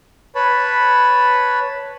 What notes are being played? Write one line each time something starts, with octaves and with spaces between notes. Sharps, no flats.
B4 C#5 A5 B5